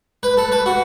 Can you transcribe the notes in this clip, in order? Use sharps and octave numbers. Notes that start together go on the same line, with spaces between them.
B4
A4
B4
F#4